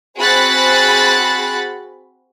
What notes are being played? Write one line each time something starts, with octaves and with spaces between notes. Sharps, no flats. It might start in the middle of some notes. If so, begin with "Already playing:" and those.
C4 F#4 G#4 B5 F#6 A6